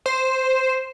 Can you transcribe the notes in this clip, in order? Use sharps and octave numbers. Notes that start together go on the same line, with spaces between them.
C5